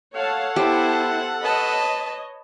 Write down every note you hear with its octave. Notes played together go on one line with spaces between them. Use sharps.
A4 C#5 F5 F#5 A5
B3 E4 G4 C5 A5
B4 C#5 D#5 A5